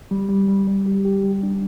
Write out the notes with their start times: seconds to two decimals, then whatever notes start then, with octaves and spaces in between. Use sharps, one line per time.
0.11 G3
0.29 G3
0.48 G3
0.67 G3
0.86 G4
1.05 G4
1.24 G3
1.43 D4